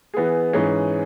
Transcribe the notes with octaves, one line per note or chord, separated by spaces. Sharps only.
E3 B3 G#4
G#2 E3 C#4 G#4